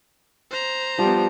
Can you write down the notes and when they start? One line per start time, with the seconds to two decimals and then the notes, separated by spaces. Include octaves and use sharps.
0.51 C5 A#5
0.99 F3 G3 B3